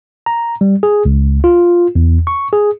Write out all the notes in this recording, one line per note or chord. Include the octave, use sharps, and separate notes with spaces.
A#5
G3
G#4
C#2
F4
E2
C#6
G#4